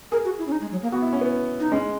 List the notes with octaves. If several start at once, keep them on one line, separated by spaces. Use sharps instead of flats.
G#4 A#4
F#4
E4
C#4
D#4
G#3
F#3
A#3
B3 F#4
E4
C#4
B3
D#4
G#3 C#4